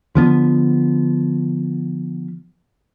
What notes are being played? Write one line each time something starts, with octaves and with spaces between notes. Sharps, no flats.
D3 F3 B3